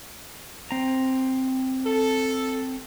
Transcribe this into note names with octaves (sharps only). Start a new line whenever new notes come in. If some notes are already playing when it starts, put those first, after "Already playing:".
C4 A#5
A4